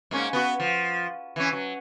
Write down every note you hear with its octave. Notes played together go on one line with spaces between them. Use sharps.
G#2 A#3 C#4
B3 F#4
F3
E3 C#4
F#3